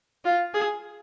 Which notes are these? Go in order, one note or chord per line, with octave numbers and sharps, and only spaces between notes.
F4
G#4